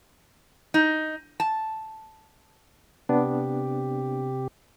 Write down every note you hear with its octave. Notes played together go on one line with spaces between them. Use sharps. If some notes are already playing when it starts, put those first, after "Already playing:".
D#4
A5
C3 B3 D4 G4